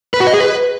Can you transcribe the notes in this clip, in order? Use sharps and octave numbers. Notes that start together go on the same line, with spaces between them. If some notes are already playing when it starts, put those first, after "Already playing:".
B4
F#4
D#5
G#4
B4